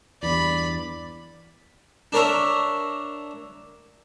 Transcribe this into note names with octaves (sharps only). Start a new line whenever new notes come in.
E2 G2 E3 D5 B5
D4 A#4 C#5 E5